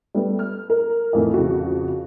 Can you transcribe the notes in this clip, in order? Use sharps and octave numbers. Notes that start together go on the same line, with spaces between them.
G3 A3 B3
F6
A#4
F2 A2 D#3 E3 A3
F2 C#3 F#4